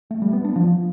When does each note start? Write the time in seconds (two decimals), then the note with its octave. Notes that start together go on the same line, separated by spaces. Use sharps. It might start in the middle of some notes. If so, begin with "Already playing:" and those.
0.11 A3
0.22 G3
0.33 B3
0.44 D4
0.56 F3